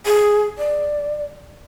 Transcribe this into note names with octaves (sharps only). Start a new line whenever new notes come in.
G#4
D5